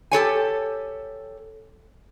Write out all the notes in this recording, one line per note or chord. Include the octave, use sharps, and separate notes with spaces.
G4 A4 C#5 G#5